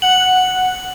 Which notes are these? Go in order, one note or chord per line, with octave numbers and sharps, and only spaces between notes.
F#5 F#7